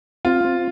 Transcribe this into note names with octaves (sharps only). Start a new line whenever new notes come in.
C4 F4
C4